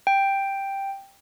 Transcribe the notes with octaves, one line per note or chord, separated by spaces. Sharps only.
G5